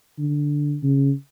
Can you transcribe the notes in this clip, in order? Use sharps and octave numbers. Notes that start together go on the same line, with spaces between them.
D3
C#3